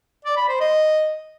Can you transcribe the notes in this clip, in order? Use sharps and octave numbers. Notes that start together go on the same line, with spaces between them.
D5
B5
C5
D#5